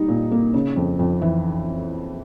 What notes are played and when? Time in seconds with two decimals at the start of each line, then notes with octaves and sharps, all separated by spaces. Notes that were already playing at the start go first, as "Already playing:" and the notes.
Already playing: G3 A#3 D#4
0.08 A#2
0.31 A#3
0.54 C#3
0.76 F2
0.99 F2
1.22 E3